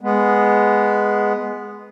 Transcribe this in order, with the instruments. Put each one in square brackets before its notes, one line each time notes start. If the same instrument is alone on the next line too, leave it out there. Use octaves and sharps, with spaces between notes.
[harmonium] G#3 B3